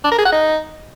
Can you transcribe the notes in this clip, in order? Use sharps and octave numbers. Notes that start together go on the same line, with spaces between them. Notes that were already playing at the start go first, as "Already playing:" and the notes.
D4
A#4
G#4
F#5
D#4